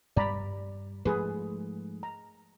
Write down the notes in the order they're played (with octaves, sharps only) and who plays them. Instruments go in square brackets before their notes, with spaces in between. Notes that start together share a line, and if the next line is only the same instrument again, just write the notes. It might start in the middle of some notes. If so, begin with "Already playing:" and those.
[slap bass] G2 G3 [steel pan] D5 A#5 B5
[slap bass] G#2 F3 A3 [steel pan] G#4 B4
[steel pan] A#5